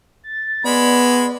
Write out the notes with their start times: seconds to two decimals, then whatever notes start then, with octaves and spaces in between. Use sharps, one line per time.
0.23 A6
0.65 G#3 B3 D5 B5